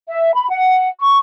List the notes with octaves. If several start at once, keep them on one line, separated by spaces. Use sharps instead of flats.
E5
B5
F#5
C#6